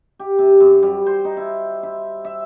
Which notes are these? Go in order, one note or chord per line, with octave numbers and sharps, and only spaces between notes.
G4
C3
F#2
G3
C5
D#4
E4
E4
E5